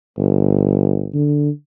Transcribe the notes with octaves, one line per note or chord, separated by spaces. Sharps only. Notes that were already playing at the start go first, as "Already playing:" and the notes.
G1
D3